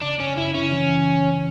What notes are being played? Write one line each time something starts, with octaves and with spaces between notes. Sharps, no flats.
C#3 D4
F#2 C#4
C#3 E4
C#3 C#4
E3